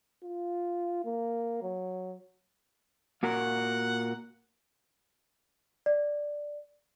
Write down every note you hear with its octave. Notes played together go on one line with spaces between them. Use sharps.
F4
A#3
F#3
A#2 F#4 A#4 F#5
D5